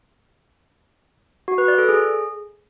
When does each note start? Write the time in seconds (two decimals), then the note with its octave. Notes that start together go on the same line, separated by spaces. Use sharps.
1.48 F#4
1.58 B4
1.68 D5
1.78 A4
1.89 G#4